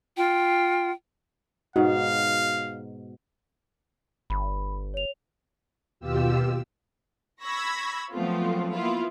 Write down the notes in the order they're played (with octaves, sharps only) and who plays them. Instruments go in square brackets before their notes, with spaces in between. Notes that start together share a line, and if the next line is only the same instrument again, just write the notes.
[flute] F4 [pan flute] G5
[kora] G#2 B2 [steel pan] F#4 [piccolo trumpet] F5
[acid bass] G1 [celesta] B5
[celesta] C#5 F7
[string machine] D#2 B2 F4 G4 E6
[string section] B5 C#6 E6 G#6 A#6 B6
F3 F#3 A3 B3 C4 F4
A#3 B3 E4 F4